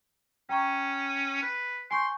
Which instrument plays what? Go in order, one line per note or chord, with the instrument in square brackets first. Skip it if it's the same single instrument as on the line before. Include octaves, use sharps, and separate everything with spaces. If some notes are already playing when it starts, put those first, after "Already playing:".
[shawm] C#4 [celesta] G5 A#5 C#6
[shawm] B4
[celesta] G#5 C#6 G6 [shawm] C6